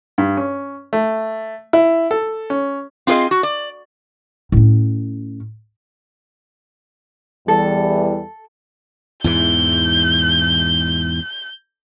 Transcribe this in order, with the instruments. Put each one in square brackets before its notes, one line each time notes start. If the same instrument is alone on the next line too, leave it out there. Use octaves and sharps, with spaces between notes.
[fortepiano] G2
C#4
A3
E4
A4
C#4
[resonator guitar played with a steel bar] C4 F4 G#4 B4 C5 D#5
F#4
D5
[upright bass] A2 C#4
[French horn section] E2 E3 G3 [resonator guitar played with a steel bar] A4
[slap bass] E2 G#2 E3 [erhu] G6